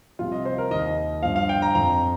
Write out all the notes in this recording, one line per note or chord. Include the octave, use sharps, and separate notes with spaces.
C2 C3 F3 F4
D#5
C5
A#4
D#2 D#3 D#5
G2 F3 F5
F5
G5
A#5
F2 F3 A#5